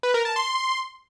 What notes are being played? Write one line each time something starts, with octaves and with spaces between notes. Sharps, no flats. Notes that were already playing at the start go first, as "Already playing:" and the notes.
B4
A#4
A5
C6